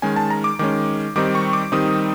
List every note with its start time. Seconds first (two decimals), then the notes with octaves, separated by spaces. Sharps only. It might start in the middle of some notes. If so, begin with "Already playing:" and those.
0.02 D#3 G#3 C#4 G#5
0.16 A5
0.30 A#5
0.44 D6
0.59 D#3 G#3 C#4 D6
1.16 D#3 G3 C4 D#4 D6
1.35 C#6
1.53 D6
1.72 D#3 G3 C4 D#4 D#6